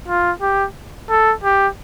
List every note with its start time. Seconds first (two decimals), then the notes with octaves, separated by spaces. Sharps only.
0.08 F4
0.41 G4
1.10 A4
1.44 G4